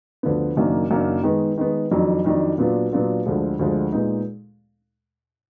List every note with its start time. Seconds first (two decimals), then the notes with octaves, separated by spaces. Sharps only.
0.23 D2 D3 F3 B3
0.56 F#1 F#2 D#3 A#3 D4
0.90 F#1 F#2 D#3 A#3 D4
1.23 D#3 G#3 B3
1.58 D#3 G#3 B3
1.91 F2 D#3 F#3 D4
2.25 F2 D#3 F#3 D4
2.58 A#2 F#3 B3 D4 F4
2.92 A#2 F#3 B3 D4 F4
3.26 D2 D3 F3 G#3
3.59 D2 D3 F3 G#3
3.92 A#2 G#3 B3 D#4